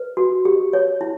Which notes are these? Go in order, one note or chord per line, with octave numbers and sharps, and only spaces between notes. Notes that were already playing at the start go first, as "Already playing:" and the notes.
Already playing: B4
F#4
G4
C#5
E4